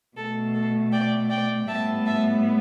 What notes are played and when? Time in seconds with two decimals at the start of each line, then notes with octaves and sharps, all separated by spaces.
0.16 B2 A3 A4
0.54 A4
0.92 D5 G5
1.29 D5 G5
1.67 A2 G3 B3 E5 A5
2.06 E5 A5